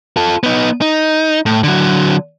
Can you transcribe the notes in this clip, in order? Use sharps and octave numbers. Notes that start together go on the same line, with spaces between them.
F4 A4
B3 D#4
D#4
A2
D3 F#3